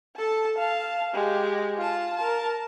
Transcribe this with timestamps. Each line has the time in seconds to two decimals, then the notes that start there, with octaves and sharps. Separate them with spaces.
0.17 A4 A5
0.58 F5 A5
1.14 G#3 G4
1.78 F4 A5
2.17 A#4 A5